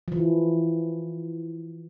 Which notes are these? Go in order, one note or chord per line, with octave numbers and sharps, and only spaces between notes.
E3 F3